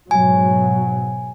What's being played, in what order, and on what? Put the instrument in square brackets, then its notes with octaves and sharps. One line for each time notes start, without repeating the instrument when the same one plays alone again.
[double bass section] G#2 B2 F#3 [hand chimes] G#5